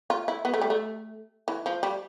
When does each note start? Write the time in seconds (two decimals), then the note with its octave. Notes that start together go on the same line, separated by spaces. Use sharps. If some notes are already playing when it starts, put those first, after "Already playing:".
0.10 F4
0.28 E4
0.45 B3
0.54 A3
0.62 G3
0.70 A3
1.48 E3
1.66 F3
1.83 G3